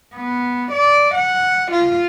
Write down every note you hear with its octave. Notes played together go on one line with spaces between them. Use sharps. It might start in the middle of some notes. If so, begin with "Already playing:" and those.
B3
D5
F#5
F4